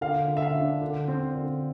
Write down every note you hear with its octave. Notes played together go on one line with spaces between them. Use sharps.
D3 F5
D3
E5
F5
D4
D3
C4
D3